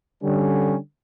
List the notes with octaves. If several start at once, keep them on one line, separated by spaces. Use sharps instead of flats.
D3 G3 C#4